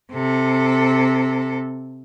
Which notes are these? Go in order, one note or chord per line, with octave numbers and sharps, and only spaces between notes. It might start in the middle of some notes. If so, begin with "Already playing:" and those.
C3 A4